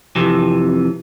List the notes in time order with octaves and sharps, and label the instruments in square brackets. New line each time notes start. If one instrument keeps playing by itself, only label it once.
[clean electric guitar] F2 C3 E3